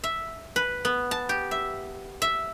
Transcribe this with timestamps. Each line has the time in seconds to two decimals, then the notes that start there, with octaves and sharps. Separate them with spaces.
0.04 E5
0.56 B4
0.85 B3
1.11 A5
1.29 G4
1.51 E5
2.22 E5